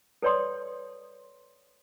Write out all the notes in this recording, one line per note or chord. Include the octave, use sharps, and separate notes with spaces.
A4 B4 C#5 D5 C6 D#6